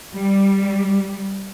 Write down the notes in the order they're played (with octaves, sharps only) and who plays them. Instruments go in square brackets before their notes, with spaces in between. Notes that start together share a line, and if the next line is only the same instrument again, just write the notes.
[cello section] G3